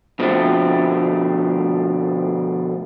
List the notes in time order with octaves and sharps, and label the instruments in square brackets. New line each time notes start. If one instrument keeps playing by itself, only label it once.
[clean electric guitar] B2 D3 F3 A3 C4